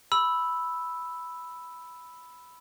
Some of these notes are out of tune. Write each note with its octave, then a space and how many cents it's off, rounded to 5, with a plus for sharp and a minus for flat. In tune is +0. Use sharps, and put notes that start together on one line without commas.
B5 +0 E6 +0